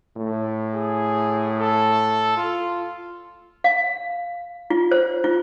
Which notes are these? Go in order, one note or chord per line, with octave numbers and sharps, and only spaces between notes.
A2
G#4
A4
F4
F5
F4
C5
F4